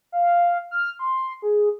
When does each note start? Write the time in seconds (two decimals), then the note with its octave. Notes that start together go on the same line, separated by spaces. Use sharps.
0.12 F5
0.71 F6
0.99 C6
1.42 G#4